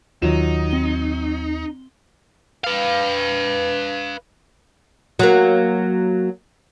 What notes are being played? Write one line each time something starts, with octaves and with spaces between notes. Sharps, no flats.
D#2 D#3 F#3 D#4 F4 E7
C4 G7
B4 F5
F#3 A#3